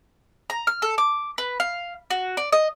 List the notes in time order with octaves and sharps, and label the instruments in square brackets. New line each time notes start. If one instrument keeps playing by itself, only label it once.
[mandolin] A#5
F6
A4
D6
B4
F5
F#4
D5
D#5